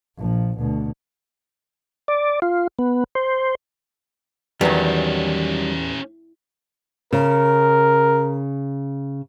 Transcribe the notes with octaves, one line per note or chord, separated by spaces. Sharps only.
A#1 F3
D2 B2
D5
F4
B3
C5
E2 D#3 F#3 G3 C#4 G4
C#3 A#4